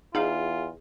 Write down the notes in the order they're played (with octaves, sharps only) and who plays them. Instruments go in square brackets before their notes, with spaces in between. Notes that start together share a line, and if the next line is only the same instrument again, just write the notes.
[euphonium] E2 [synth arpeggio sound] D#4 F5 [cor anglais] F4 [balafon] G#4